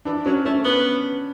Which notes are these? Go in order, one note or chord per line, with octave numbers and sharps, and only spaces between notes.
E3 D4
F#3 C#4
A3 C#4
B3 B4